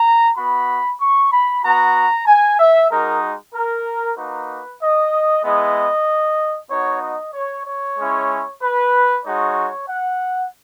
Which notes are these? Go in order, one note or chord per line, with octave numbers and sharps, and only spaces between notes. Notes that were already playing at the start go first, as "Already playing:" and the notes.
Already playing: A#5
B3 F#4 B5
C#6
B5
B3 F#4 A#5
G#5
E5
G#3 D#4 F#4 A#4
A#4
A#3 D#4 F#4 B4
D#5
G#3 B3 E4 D#5
B3 D#4 F#4 C#5
D#5
C#5
C#5
G#3 C#4 E4
B4
G#3 D#4 F#4 C#5
F#5